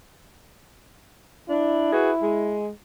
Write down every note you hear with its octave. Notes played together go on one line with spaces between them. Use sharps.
D4 E4
F#4 G#4 B4
G#3